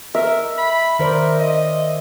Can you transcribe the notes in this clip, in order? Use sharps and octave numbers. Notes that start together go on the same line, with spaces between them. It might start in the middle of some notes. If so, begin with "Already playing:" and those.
A#4 E5
B5
D#3 A#4 C5 D5
D#5